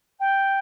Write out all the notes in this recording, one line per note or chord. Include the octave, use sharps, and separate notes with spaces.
G5